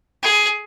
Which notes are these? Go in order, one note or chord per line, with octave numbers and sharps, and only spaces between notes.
G#4